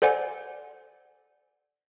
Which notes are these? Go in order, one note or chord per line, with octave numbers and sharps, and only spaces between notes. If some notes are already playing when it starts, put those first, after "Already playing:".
A4 C5 D5 F#5 G#5